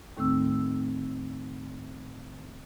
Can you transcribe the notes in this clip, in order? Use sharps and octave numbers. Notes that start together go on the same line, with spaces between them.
D#2 A2 D#3 A3 C4 E6